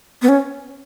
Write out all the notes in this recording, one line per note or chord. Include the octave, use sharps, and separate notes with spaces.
B3
C#4